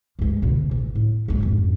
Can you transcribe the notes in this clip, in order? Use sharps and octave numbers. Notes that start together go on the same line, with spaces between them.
G2 G#3
D2 B2
A1
A2
E2 G#3
G#1 F2